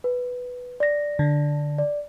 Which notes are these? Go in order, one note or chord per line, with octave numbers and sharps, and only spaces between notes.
B4
D5 A#6
D3
D5